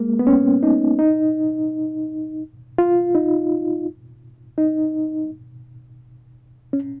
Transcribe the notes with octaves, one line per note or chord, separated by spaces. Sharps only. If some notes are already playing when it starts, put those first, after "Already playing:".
Already playing: G#3 A#3
B3
C#4
D#4
D#4
F4
D#4
D#4
C#4